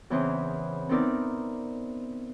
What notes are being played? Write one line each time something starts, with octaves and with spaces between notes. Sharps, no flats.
E2 C#3 E3 C4
B3 C4 D#4 E4 A#4 D5